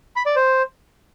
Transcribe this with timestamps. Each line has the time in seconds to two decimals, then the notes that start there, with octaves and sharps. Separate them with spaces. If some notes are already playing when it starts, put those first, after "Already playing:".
0.16 B5
0.26 D5
0.36 C5